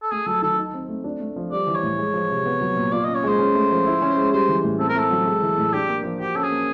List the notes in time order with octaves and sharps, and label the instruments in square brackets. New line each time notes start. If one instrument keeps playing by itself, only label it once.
[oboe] A4
[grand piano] A3 [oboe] G#4
[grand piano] F#3 [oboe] A4
[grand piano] D#3 [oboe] A4
[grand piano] D#4
C4
A3
D4
A3
F3
[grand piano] G3 [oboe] D5
[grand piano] E3
[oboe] C#5
[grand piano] A2
G#3
F3
C3
B3
F#3
A#2
[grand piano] F4 [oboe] D5
[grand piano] C#4 [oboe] D#5
[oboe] C#5
[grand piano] G#3 [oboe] C5
[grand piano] C#4
A3
F3
E4
C#4
G#3
[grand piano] G3 [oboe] C5
[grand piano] E3
A2
[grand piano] C4 [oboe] A4
[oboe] A#4
[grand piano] A3 [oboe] A4
[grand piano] F#3
G#3
E3
A2
[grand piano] D4 [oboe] G4
[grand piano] A#3
F3
[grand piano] F#4 [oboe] G4
[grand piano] C#4 [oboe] A4
[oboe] G#4
[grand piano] A#3